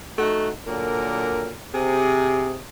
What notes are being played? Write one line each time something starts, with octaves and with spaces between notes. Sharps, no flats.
A3 D#4 F#4
A#2 D3 F#3 A#4
C3 G#4